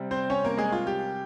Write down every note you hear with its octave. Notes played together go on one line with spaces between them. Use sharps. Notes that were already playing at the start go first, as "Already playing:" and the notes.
Already playing: C3 G3
C4 C5
C#4 C#5
A#3 A#4
G#3 G#4
F4
G4